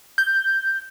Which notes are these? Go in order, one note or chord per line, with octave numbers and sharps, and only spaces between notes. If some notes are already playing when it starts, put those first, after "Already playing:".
G6